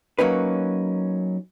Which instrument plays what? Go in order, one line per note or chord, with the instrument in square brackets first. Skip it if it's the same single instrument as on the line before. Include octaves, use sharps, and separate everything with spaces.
[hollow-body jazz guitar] F#3 A#3 C#4 D#4 B4